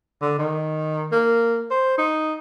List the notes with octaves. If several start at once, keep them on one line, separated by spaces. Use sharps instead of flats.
D3
D#3
A#3
C5
D#4